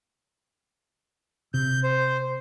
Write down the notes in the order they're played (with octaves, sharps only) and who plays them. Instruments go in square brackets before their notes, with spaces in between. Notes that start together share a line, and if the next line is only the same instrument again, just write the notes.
[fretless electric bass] C3 [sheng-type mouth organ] G6
[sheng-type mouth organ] C5